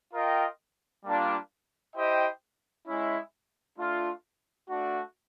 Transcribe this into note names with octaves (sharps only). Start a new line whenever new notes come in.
F4 A#4 D#5 G5
G3 A#3 D4 F4
E4 G4 C5 D#5 G5
G#3 C#4 E4
A3 D4 F4
A3 D4 F#4